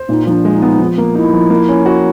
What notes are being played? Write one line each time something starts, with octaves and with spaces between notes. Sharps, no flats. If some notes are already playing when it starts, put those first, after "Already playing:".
Already playing: C5
A#2 D#4
F3 D#4
D4
G#3
D#4
B3
F3
A#3
D#4 E4
F3
A#3
C#4
F#4